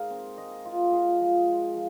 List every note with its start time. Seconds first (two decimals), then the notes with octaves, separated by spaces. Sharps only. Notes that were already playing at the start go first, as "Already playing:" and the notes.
Already playing: G#3 D#4 G#4 A#4 C5 F5
0.11 C4
0.38 G#3 D#5
0.65 G#3 F4
0.92 F4 G#4
1.19 F3
1.47 G#3
1.74 F3